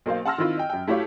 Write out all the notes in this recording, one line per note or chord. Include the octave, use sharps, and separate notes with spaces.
B1 A#3 C5 F5
F#5 A5 C6 E6 F6 A#6
D#3 C4 E4 F4
D#5 G5
F#2 G5
A3 E4 F#4 G4 C#5 F5